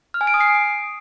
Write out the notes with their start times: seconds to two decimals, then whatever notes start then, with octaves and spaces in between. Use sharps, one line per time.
0.14 F6
0.21 G#5
0.27 D7
0.34 D#6
0.40 C7